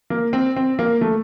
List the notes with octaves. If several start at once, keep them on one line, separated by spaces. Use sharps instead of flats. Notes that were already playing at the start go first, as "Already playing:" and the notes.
A#3
C4
C4
A#3
A3